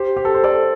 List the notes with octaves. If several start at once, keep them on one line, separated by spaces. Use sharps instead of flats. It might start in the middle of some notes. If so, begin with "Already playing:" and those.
Already playing: G4 C5
G4
A4
C5
A4 D5